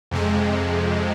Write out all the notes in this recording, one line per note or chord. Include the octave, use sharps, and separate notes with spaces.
F2 C3 G#3